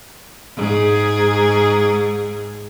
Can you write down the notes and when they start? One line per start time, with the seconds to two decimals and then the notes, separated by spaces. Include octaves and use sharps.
0.57 G#2 G#4